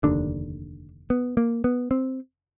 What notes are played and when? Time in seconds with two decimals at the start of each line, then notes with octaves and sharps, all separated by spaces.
0.03 F1 D#2 D3 D4
1.10 B3
1.37 A#3
1.64 B3
1.91 C4